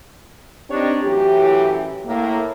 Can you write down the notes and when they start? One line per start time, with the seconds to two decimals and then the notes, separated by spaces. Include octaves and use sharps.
0.70 C4 D4 D#4 G4 C#5
1.02 F#2 A2 E3 G4
2.05 A2 A#3